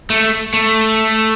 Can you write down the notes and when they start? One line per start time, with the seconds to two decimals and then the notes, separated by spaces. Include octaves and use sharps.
0.10 A3
0.54 A3